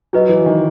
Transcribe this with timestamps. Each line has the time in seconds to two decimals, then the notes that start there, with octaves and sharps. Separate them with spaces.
0.13 F#3 G#4 B4 D#5
0.29 E3
0.46 D#3